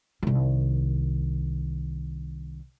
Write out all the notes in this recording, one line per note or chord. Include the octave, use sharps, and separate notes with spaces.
C2 D#3